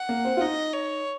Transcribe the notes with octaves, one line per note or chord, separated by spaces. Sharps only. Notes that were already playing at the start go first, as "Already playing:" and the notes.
Already playing: F#5
A#3
C4
F4
D#4 D#5
C#5